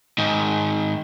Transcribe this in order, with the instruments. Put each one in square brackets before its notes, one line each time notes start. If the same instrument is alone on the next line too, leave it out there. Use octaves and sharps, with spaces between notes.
[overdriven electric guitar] G#2 D#3